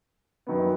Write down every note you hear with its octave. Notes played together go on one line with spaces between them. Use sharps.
F#2 D#3 F#3 B3